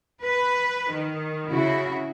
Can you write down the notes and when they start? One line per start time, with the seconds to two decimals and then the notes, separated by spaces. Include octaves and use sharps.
0.23 B4
0.91 D#3
1.50 C#3 E4 F#4